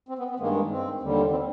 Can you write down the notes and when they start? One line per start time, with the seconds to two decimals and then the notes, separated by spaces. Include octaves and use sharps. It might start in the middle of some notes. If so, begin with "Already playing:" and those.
0.09 C4
0.19 B3
0.30 B3
0.39 G2 D#3 G#3 A#3
0.71 C4
1.01 D#2 D3 G3
1.31 C4